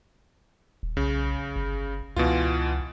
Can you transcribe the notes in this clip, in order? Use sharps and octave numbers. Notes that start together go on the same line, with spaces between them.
D#1
B1 C#3
G1
C#2 B2 E3 F4